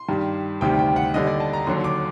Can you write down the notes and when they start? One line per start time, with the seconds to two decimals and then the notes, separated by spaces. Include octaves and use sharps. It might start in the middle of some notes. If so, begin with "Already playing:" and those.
Already playing: C6
0.08 G2 D#3 G3
0.61 D2 C3 D#3 G3 G5
0.79 G5
0.96 F#5
1.14 D#2 D3 G3 D#5
1.27 D5
1.40 A5
1.53 A#5
1.67 D#2 D3 F#3 C6
1.84 D6